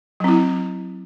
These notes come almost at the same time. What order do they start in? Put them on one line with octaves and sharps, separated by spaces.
F#3 C4 E4